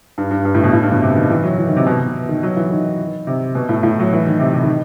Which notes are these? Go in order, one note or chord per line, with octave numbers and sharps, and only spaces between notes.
G2
G2
G2
A2
B2
A2
G2
B2
C3
D#3
E3
F#3
E3
D#3
C3
B2
B2
D#3
F#3
E3
D#3
C3
B2
A2
A2
F#3
E3
D#3
C3
C3
D#3